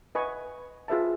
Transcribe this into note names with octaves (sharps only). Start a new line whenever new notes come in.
B4 D#5 G#5 C#6
F4 G#4 B4 E5 A5